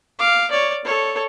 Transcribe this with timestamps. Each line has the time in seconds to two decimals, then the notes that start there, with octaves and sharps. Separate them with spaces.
0.19 F5 D6
0.51 C#5 D5
0.84 A4 C#5